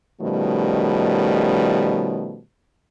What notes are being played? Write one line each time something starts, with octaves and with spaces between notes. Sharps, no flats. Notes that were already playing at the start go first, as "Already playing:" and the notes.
B2 D#3 F3 G3 A3 C#4